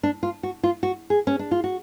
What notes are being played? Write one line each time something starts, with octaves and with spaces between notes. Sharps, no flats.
D4
F4
F#4
F4
F#4
G#4
C#4
D4
F4
F#4